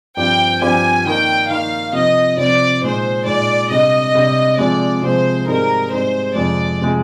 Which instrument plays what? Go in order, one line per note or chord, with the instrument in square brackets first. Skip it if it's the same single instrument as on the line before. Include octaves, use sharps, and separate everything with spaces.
[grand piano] G2 F3 C4 G4 C5 [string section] G5
[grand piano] G2 F3 C4 G4 C5 [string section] G#5
[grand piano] D#3 A#3 D#4 A#4 [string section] G5
[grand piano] D#3 A#3 D#4 A#4 [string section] F5
[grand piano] C3 F3 C4 [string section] D#5
[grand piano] C3 F3 C4 [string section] D5
[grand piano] A#2 G#3 D#4 [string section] C5
[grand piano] A#2 G#3 D#4 [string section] D5
[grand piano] C3 G3 D4 [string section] D#5
[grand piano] C3 G3 D4
[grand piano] C3 F3 G#3 [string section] D5
[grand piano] C3 F3 G#3 [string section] C5
[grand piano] G#2 G3 C4 D#4 G#4 [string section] A#4
[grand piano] G#2 G3 C4 D#4 G#4 [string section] C5
[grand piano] F2 C3 F3 G#3 [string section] D5
[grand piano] C3 F3 G#3